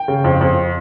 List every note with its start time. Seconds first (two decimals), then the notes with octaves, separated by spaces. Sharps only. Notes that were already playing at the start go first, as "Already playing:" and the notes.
Already playing: G5
0.08 C#3
0.24 F2
0.41 F2